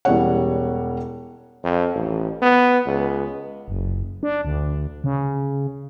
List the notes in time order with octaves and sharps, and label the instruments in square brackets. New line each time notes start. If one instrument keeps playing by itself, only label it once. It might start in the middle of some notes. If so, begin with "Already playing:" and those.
[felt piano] E1 E3 G3 C#4 C#5 F#5
[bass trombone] F2
A1
B3
C#2
[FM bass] F#1
D4
D2
C#3